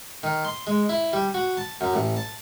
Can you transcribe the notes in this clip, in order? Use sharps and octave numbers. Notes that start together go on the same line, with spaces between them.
D#3
C6
G#3
E4
G3
F#4
A5
F#2
A1
A5